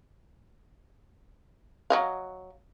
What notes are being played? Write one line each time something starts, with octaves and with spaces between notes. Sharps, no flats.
F#3 D#5 F5